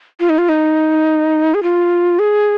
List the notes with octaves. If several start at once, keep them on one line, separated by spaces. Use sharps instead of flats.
F4
D#4
F4
D#4
G#4
F4
G#4